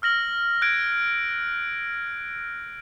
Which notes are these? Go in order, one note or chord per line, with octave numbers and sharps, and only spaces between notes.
E6 F6 A#6 F#7
F#6 G#6 D7